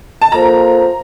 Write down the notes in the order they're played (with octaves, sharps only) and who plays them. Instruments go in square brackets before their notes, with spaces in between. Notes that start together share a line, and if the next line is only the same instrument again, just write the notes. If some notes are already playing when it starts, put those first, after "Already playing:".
[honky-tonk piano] A5
[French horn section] A#3 F4 A4 C5 [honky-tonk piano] A#5